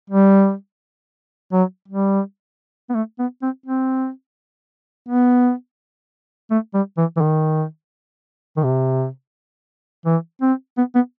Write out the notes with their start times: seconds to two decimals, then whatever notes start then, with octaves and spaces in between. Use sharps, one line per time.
0.10 G3
1.52 F#3
1.88 G3
2.90 B3
2.95 A3
3.19 B3
3.42 C4
3.66 C4
5.09 B3
6.51 A3
6.74 G3
6.98 E3
7.17 E3
7.21 D#3
8.57 D#3
8.64 C3
10.06 E3
10.42 C4
10.78 B3
10.95 B3